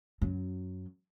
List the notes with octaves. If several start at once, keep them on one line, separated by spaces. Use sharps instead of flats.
F#2 F#3